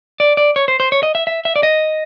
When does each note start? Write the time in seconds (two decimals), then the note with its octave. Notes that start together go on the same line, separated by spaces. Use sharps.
0.20 D5
0.37 D5
0.56 C#5
0.68 C5
0.80 C5
0.92 C#5
1.03 D#5
1.15 E5
1.27 E5
1.45 E5
1.56 D5
1.63 D#5